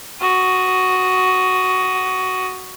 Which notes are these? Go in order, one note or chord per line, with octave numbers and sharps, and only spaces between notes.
F#4 D#6